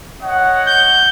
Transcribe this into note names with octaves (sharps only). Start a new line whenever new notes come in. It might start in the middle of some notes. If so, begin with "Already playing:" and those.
C#5 D#5 F#5
G6